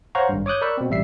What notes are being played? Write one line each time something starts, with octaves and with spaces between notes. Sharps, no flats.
C5 C#5 F5 F#5 A#5 C#6
G#1 G2
C#5 D6 D#6 F#6 G6
A#4 D5 B5 C#6 E6 F#6
B2 C4
A1 G3 E5 C7